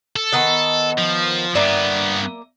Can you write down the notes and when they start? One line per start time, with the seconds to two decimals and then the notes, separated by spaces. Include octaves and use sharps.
0.16 A4
0.32 D#3 B3 D#5
0.98 F3
1.55 G2 A#3 B3 D5 E5